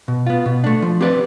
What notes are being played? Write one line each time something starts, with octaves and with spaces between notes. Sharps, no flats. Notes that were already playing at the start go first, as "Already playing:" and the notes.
B2
B3 F4
B2
A3 D4
F3
C4 G4 B4 D5